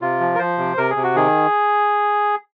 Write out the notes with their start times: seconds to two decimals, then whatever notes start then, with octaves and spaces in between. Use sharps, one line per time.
0.02 C3 F4
0.20 F3
0.35 A#4
0.39 F3 C5
0.58 C3
0.78 C3 A#4
0.90 G#4
0.96 C3
1.03 F#4
1.15 D#3 G#4